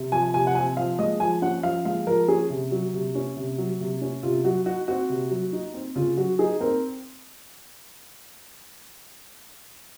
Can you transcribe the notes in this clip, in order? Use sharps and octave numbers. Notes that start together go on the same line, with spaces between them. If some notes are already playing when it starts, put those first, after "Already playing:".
Already playing: C3
F3 G#5
C3 G#5
F#5
C4 G#5
F3 F5
G#3 D#5
F3 G#5
C#4 F#5
F3 F5
G#3 F5
F3 A#4
C#4 G#4
C3
F#3
C3
C#4
C3
F#3
C3
C#4
C3 F4
F#3 F#4
D#4 F#4
C4 F#4
C3
F#3
D#4
C4
C#3 F4
F#3 F#4
D#4 G#4
C4 A#4